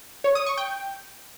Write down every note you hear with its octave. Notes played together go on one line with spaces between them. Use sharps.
C#5
D#6
C#6
G5